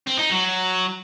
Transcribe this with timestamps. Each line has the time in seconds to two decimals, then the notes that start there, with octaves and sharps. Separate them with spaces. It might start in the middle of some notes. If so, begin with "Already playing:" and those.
0.07 C4
0.18 D#4
0.30 F#3